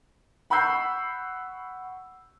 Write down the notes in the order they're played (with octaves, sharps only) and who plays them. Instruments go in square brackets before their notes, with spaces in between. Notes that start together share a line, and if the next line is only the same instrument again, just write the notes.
[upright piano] F#5 B5 C#6 E6 G6 C7